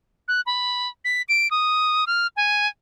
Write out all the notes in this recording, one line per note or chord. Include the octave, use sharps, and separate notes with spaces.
F#6
B5
B6
D7
D#6
F6
G#5